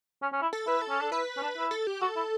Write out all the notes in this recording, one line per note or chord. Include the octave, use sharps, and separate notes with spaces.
C#4
C#4
E4
A4
E4 B4
A4
C#4
D4
E4 B4
C#4
D4
E4
A4
G4
F#4 A4
E4